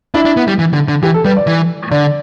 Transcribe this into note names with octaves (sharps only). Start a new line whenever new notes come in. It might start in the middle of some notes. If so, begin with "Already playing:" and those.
D4 E4
D4
B3
G3
E3
D3
D3
E3 G4
A4
G3 B4
D5
E3
D3 D5